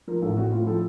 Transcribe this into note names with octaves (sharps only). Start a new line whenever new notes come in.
F3 A#4
A1 A4
C4 F#4
A2 F4
F3 A4